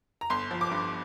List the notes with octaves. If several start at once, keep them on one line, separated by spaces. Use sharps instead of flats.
A#5
G1 C6
F3
D6
G2